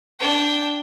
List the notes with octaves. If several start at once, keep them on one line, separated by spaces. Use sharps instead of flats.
D4 G5